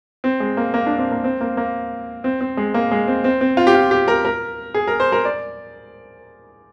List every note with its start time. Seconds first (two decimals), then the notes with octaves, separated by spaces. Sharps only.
0.24 C4
0.40 G#3
0.57 A#3
0.74 A#3
0.87 D4
0.98 C4
1.12 A#3
1.24 C4
1.41 A#3
1.57 A#3
2.24 C4
2.41 C4
2.57 G#3
2.74 A#3
2.91 G#3
3.08 C4
3.24 C4
3.41 C4
3.57 F4
3.67 G4
3.75 F4
3.91 G4
4.08 A#4
4.25 A#4
4.74 G#4
4.88 A#4
5.00 C5
5.12 A#4
5.25 D5